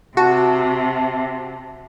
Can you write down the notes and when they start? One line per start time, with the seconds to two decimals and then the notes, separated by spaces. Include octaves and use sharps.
0.17 C3 F#4 A5